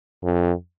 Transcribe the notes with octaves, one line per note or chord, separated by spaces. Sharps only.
F2